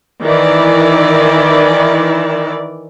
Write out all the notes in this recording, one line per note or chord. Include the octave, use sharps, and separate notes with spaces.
D#3 E3 D5